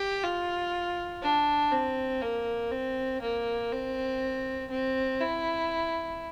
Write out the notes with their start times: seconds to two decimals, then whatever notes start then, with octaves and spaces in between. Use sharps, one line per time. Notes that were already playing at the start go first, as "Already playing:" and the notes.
Already playing: G4
0.23 F4
1.22 D4
1.72 C4
2.21 A#3
2.72 C4
3.21 A#3
3.72 C4
4.71 C4
5.20 E4